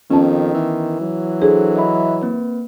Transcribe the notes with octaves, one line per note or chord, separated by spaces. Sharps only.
F2 D#3 B3 C#4 A5
E3
F#3
D4 G#4 A4 C5
D#5 E5 B5
A#3 C4 B4